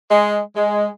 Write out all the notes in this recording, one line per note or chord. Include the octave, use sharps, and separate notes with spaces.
G#3
G#3